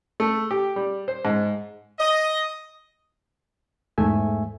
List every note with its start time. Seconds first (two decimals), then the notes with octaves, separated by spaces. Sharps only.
0.20 A3
0.51 G4
0.76 G3
1.08 C5
1.25 G#2
1.99 D#5
3.98 E2 G#2 A3 E5 G#5